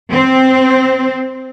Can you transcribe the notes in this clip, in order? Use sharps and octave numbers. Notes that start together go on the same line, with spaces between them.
C4